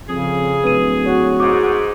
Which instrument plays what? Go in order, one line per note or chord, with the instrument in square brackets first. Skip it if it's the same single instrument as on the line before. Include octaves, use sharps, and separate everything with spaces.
[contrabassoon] F2 [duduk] C#3 [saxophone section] G#4
[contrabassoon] D1 [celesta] B4 D#7
[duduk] F#4 [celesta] C#5
[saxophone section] G#2 [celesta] D6